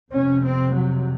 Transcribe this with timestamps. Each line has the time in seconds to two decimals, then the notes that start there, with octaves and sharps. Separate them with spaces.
0.12 F2 C3 C#4
0.43 C4
0.74 F#3